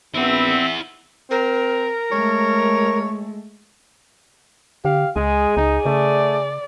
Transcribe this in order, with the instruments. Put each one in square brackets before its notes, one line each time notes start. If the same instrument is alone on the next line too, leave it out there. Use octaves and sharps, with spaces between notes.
[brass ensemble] A#1 B3 [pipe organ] C4 [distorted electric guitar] E4 F#5 [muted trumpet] E5
[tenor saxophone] C4 [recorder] A#4
[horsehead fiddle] G#3 A3 [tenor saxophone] C#5
[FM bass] D3 [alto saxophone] G4 [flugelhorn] F5
[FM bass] C#2 [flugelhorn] G#3 [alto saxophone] G#4
[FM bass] C#2 [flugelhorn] D#4
[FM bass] C#3 [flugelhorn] A3 [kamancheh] D5